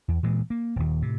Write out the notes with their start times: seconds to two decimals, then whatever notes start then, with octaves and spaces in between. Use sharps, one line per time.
0.08 E2
0.23 A#2 E3 G#3
0.50 A#3
0.76 D#1 D#2
1.02 A2 C3